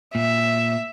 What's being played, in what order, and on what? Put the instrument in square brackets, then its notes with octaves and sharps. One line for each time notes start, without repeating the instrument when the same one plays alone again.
[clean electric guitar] A#2 [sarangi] E5